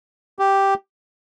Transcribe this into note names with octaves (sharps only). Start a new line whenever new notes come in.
G4